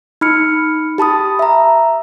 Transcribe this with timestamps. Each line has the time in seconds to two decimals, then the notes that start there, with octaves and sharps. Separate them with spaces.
0.21 D#4 B5 F6 C#7
0.98 G4 A5 B5 D#6
1.39 E5 A#5